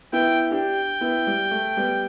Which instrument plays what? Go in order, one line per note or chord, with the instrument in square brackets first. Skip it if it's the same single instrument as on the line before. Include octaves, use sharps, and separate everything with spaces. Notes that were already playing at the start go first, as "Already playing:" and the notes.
[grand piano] B3 E4 [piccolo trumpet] G5
[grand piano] D4 G4 [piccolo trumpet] G5
[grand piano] B3 E4
G3
A3
G3 B3